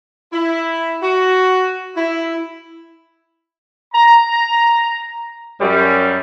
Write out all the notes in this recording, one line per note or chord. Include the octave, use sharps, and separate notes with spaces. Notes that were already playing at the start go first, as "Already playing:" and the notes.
E4
F#4
E4
A#5
F#2 G3